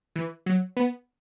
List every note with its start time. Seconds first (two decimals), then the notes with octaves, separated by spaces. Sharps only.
0.16 E3
0.46 F#3
0.77 B3